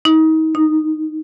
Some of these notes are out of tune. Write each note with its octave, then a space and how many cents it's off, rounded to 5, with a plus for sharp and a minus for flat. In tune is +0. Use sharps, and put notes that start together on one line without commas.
D#4 +35
D#4 -5